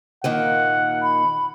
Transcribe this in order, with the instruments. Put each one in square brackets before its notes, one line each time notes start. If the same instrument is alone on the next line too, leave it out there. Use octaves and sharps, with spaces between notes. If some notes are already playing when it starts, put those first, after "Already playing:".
[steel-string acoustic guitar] A#2 D#3 A#3 [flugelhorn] F#5
[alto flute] B5